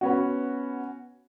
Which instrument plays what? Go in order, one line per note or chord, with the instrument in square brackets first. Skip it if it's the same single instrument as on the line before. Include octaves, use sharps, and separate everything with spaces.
[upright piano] B3 C#4 F#4